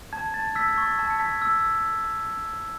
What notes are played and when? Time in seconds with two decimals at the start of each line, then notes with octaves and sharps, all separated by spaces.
0.13 A5 G#6
0.34 A5 A6
0.55 E6 G#6 B6
0.69 G#6
0.77 C#6 A6
0.98 A5 G#6
1.10 C#7
1.19 A5 G#6 B6
1.42 E6 G#6